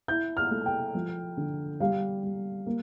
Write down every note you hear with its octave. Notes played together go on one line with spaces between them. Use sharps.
E4 G6
F6
A3
G5
F3
D3
G3 F5
G3
A#3